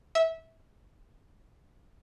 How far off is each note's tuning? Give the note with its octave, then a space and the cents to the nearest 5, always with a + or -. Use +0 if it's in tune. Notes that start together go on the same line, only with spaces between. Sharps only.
E5 -20